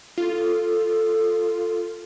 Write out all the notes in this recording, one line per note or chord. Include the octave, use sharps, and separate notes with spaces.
F4 A4